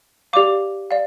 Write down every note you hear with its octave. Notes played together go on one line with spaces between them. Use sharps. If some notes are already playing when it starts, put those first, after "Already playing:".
G4 D5 F5 D6
D5 F5